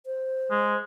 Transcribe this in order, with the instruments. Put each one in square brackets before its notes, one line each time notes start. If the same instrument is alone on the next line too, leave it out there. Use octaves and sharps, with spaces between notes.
[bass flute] C5
[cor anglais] G#3